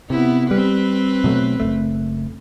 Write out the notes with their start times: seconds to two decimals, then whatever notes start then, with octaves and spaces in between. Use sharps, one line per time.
0.10 C3 B3 E4
0.51 G3 C4 B4
1.24 B2 F#3 A3
1.60 F#1 C#2 A3